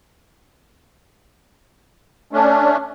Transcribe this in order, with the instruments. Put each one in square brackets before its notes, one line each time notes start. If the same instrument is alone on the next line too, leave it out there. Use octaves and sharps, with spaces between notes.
[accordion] A3 C#4 D4